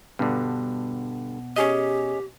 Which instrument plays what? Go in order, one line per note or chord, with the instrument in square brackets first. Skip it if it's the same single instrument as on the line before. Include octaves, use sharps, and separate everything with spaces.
[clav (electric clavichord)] G2 D3 [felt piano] B2
[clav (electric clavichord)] C#4 G#4 D#5 [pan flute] G4